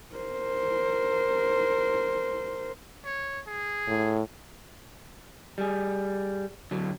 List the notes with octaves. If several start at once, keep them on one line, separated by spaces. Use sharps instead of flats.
A#4 C5
C#5
G#4
A2
G3 G#4
D3 F#3